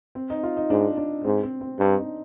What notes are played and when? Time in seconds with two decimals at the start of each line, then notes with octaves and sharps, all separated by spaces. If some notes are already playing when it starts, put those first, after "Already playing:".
0.15 C4
0.30 D#4
0.43 F4
0.57 D#4
0.70 G#2 D4
0.97 D4
1.24 G#2 C4
1.43 C4
1.61 C4
1.79 G2 D4
1.98 D#4